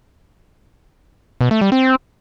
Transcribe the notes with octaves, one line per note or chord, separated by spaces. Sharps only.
B2
A3
G3
C4